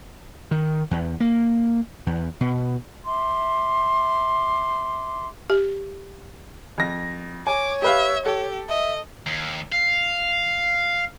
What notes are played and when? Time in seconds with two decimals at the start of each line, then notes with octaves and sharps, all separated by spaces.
0.51 D#3
0.91 E2
1.20 A#3
2.06 E2
2.41 B2
3.06 E5 C6 D6
5.50 G4
6.78 F2 A#6
7.47 C#5 G#5 D6
7.82 G4 B4 E5 F5
8.26 G4 A4
8.69 D#5 E5
9.26 D#2
9.72 F5